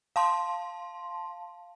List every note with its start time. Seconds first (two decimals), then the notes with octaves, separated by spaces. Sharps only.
0.16 F5 A5 C6